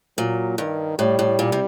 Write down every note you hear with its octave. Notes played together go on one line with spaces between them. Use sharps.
A#2 F#3
G2 D#3
A2 G3
A2
A#2
C3